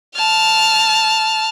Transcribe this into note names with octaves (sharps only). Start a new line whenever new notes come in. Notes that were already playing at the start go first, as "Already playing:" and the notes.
A5 F6